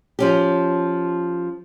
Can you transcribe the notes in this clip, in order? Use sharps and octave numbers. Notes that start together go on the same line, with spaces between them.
F3 C#4 G4